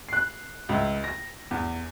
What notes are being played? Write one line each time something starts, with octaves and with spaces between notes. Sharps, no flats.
F#6 C7
C#2 E5
A#6
E2